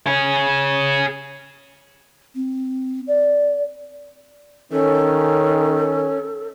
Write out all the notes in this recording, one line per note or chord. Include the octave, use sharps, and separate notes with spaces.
G#4 C#5
C4
D5
D#3 C#4 A4